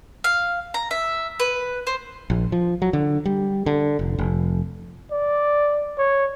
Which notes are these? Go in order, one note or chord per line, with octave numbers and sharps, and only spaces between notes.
F5
A#5
E5
B4
C5
A#1
F3
F#3
D3
G3
D3
F1
F1
D5
C#5